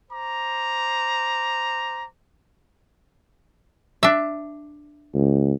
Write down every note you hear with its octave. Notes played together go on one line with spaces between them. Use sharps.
C5 A#5 D6
D4 E5
C#2